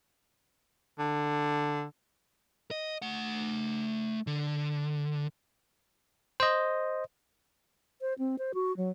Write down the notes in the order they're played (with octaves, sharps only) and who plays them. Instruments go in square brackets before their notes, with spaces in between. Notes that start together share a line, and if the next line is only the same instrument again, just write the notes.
[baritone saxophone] D3
[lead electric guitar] D#5
A3 F#5
D3
[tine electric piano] C5 D#5
[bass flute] C5
C4
C5
F#4
F#3